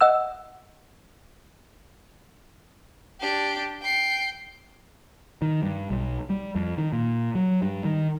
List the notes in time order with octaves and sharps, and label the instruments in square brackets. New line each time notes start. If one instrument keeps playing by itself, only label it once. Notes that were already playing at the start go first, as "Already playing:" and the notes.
[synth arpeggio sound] D#5 F#5 E6
[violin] D4 G4
G5 C7
[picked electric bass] D#3
G2
B1
G3
F2
D#3
A#2
F#3
G2
D#3